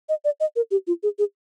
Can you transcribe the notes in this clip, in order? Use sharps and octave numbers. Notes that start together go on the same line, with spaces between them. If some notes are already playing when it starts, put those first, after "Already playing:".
D#5
D5
D#5
A#4
G4
F4
G#4
G#4